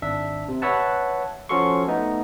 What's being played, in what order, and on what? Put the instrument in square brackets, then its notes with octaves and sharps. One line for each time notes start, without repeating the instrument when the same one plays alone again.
[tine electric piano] G#1 D4 E5
C3
B4 C#5 E5 F#5 A5
F3 C#4 F#4 A4 C6 C#6
A3 B3 D#4